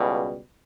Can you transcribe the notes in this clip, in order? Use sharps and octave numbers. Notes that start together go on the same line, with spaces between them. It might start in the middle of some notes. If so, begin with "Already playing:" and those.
Already playing: C#2 B2 G3